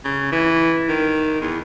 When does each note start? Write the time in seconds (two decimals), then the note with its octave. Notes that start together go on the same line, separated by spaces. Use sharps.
0.05 C#3
0.32 E3
0.89 D#3
1.41 E2